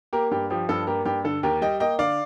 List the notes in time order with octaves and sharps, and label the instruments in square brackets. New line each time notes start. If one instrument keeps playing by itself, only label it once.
[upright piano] A#3 G4 A#4
G2 G4
F3 G4
G2 A4
A#3 G4 A#4
G2 G4
D3 A4
D#2 G4 A#4
G3 D#5 G5
A#3 D#5 G5
D3 D5 F5